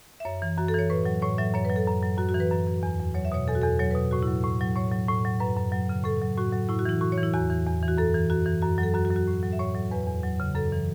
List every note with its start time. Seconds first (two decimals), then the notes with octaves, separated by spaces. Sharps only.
0.20 E5
0.25 F#2 C#5
0.42 E3
0.57 F#2 F#4
0.68 A4
0.74 E3 C#5
0.90 A2 B4
1.05 F#3
1.22 A2 C#5
1.38 F#3 E5
1.54 F#2 C#5
1.65 B4
1.70 F#3
1.76 A4
1.87 F#2
2.02 F#3
2.18 F#2 F#4
2.29 F#4
2.34 E3
2.40 B4
2.51 F#2
2.67 E3
2.83 E2
2.99 E2
3.15 F#3 C#5
3.25 E5
3.32 B2 C#5
3.48 E2 A4
3.55 F#4
3.61 E2 A4
3.79 F#3 C#5
3.91 B2 B4
4.11 A2 F#4
4.23 F#3 E4
4.44 A2
4.61 F#3
4.76 A2 C#5
4.92 F#3
5.09 A2
5.25 F#3
5.40 F#2 B4
5.56 F#2
5.72 F#3
5.89 C#3
6.04 A2 A4
6.22 F#3
6.38 A2 F#4
6.53 F#3
6.69 A2 E4
6.79 F#4
6.85 E3 E4
7.01 A2 F#4
7.12 C#5
7.17 E3
7.23 E4
7.34 E2 F#4
7.50 E3
7.66 E2
7.82 E3
7.88 F#4
7.97 F#2 A4
8.14 E3
8.30 F#2 F#4
8.46 E3
8.62 F#2 F#4
8.78 F#3
8.83 A4
8.94 F#2 F#4
9.05 F#4
9.11 F#3
9.16 F#4
9.27 A2
9.43 F#3
9.53 E5
9.59 A2 C#5
9.75 F#3
9.91 E2 B4
10.07 E2
10.23 F#3
10.40 C#3
10.55 F#2 A4
10.72 E3